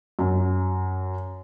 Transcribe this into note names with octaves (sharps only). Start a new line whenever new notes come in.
F#2